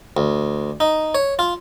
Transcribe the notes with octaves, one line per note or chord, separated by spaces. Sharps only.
D2
D#4
C#5
F4